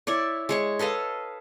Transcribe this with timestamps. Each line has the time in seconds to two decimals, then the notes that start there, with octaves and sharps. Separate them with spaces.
0.07 E4 C#5 D5
0.49 G#3 C#5 C#6
0.79 A4 B4 D#5 F5